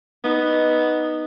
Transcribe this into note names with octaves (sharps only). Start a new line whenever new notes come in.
B3 D#4